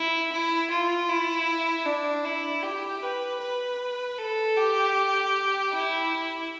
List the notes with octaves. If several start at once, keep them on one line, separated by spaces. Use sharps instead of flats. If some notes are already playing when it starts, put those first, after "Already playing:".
Already playing: E4
E4
F4
E4
D4
E4
G4
B4
B4
A4
G4
E4